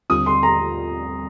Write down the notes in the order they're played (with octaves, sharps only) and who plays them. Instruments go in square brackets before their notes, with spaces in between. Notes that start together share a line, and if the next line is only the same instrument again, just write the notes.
[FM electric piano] D#2 D3 G3 C4 F4 [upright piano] D#6
[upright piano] C6
A#5